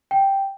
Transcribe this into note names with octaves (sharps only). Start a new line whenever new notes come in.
G5